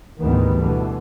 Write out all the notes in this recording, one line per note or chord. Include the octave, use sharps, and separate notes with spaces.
D2 G#2 D#3 E3 G3 B3
B2 D3 E3